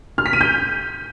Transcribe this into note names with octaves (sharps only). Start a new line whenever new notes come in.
F6
B6
D#7
G6